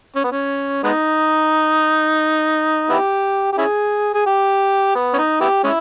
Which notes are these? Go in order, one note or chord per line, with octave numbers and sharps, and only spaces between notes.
C#4
B3
C#4
G#3 B3 D#4
B3 E4 G4
G4
C#4 E4 G#4
G#4
G4
B3
C#4
D#4
B3 E4 G4
G#3 C#4 E4